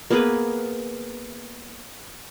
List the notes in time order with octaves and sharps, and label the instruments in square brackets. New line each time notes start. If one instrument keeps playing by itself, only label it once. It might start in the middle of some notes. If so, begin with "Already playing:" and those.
[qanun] A#3 B3 G#4 B4